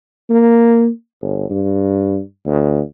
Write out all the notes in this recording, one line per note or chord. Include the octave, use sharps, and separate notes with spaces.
A#3
G1
G2
D2